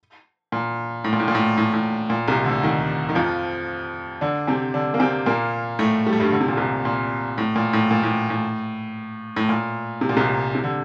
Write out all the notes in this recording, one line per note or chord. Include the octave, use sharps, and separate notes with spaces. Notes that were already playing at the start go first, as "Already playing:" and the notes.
A#2
A2
A#2
A2
A#2
A2
A2
A2
A#2
C2 C3
D2 D3
D#2 D#3
D#3
F2 F3
D3 D4
C3 C4
D3 D4
A#3
C3 C4
A#2 A#3
A2 A3
G3
A3
G2 G3
D3
C3
A#2
C2 C3
A#2
A2
A#2
A2
A#2
A2
A2
A2
A#2
C3
A#2
C2 C3
C3
D3